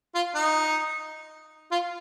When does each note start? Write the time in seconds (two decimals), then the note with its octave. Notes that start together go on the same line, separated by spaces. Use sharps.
0.15 F4
0.35 D#4
1.72 F4